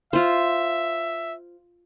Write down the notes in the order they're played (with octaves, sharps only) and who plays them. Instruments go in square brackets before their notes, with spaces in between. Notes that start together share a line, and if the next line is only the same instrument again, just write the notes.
[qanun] F4 C5 [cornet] E5